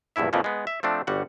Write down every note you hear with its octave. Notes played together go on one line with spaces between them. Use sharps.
A#1 E2 G2 E4 E5
F2 A#2 E3 F3 G#3
G#3 B3
E5
F3 A3 C4 D4
G1 G3 F#4 F#5